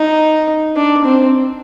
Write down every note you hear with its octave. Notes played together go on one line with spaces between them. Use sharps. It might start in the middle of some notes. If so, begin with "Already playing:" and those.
Already playing: D#4
D4
C4